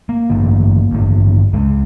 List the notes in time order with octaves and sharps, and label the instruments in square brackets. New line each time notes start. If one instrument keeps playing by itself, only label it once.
[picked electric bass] A#3
A1 G2 D3
A1 G2 D3
C#2 C#3 G#3